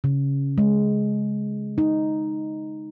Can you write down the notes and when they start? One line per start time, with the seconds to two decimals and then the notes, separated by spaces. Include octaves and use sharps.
0.04 C#3
0.58 G#3
1.78 D#4